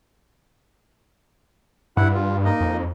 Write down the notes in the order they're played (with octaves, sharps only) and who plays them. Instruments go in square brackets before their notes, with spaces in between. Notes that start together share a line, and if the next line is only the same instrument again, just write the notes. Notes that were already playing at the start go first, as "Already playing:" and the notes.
[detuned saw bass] G2 [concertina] E4 F#5
[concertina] F4
A#3 D#4 D#5
[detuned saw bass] F2